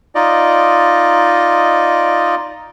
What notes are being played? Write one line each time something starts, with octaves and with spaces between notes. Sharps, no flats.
D#4 F4 D5 D#5